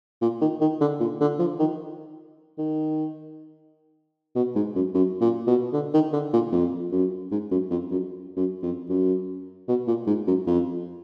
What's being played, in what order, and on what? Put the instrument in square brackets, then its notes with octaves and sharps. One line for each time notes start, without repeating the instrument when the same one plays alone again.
[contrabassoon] A#2
D#3
D#3
D3
A#2
D3
F3
D#3
D#3
B2
G#2
F#2
F#2
A#2
B2
D3
D#3
D3
A#2
F2
F#2
G#2
F#2
F2
F#2
F#2
F2
F#2
B2
A#2
G#2
F#2
F2